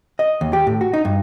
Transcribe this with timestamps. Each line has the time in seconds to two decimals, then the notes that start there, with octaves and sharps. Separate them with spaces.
0.19 D#5
0.41 D#2
0.53 G4
0.67 A2
0.81 F#4
0.93 D#4
1.05 G2